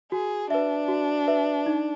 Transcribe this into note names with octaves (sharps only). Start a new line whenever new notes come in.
F#4 G#4
D4 B4 E5
F#4
B4 E5
D#4